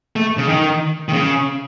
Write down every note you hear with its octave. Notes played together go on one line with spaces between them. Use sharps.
A3
C#3
D#3
D#3
C#3